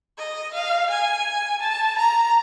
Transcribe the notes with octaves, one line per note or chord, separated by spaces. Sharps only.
D#5
F5
G#5
A5
A#5